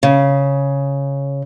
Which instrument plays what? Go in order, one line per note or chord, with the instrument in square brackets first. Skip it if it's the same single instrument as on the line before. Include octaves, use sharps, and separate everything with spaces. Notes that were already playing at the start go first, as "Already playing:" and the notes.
[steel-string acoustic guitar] C#3